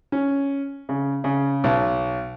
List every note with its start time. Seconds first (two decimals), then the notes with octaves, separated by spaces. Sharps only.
0.12 C#4
0.89 C#3
1.24 C#3
1.64 B1